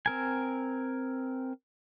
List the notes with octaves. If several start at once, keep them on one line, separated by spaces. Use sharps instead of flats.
C4 A#4 G#5